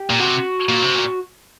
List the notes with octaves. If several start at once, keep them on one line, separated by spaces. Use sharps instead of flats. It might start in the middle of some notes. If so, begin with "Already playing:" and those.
Already playing: G4
A#2
C3 F#4
A#2
C3
A#2